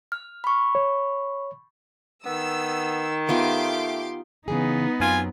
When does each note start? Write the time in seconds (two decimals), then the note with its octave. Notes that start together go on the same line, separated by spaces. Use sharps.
0.12 F6
0.44 B5 C#6
0.75 C#5
2.26 D#3 B3 E6
3.29 A3 B3 D#4 F4 G4 C6 D6
4.48 C#3 E3 B3 D#4 G#4
5.00 F#2 F#3 C4 F4 G#5